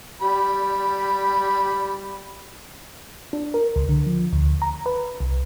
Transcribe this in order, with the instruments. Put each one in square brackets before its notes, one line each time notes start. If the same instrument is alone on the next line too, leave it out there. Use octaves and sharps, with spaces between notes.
[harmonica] G3 B5
[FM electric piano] D4
A#4
C#2
D3
F3
D2
A#5
B4
C2